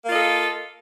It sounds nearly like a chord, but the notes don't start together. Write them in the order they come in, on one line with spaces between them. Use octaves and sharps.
A#3 F4 D#5 A4